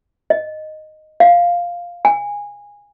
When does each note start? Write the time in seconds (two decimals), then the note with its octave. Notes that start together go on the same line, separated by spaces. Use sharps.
0.30 D#5
1.20 F5
2.05 G#5